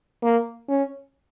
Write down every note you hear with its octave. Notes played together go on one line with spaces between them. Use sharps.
A#3
C#4